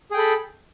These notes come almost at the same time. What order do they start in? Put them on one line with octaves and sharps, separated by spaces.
G#4 G5 A4 B5